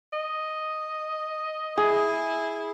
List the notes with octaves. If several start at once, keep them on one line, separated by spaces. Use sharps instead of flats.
D#5
E4 G#4